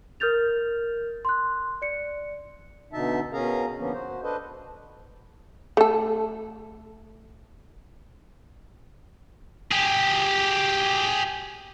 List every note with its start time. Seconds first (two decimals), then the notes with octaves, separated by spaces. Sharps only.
0.20 A#4 F6 G6 A6 F7
1.25 C6 F#6
1.82 D5 C#7
2.93 B2 D3 D#4 E5 A5
3.33 B2 C#4 G#4 A#4 F5 A#5
3.79 D3 F3 A#3 B3 C#4
3.93 F#4 C5
4.23 D4 A4 B4 C5 D#5
5.77 A3 A4
9.71 G4 G#4